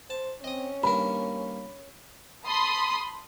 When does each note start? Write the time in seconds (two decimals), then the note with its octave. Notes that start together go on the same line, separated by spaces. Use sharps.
0.10 C5 A5
0.44 C4 C#4 D#5 D#6
0.83 G2 D#3 A#3 A#4 B5
2.47 A5 B5 C6 D#6